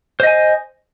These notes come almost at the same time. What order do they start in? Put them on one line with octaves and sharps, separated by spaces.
C5 D#5 G#5